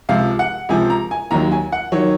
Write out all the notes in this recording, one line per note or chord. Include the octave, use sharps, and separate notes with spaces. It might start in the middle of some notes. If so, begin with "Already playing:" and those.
C#2 C3 F3 F5
F#5
C#2 C3 F3 G#5
A#5
G#5
D#2 D#3 F#3 A#5
G#5
F#5
D#3 F#3 C#5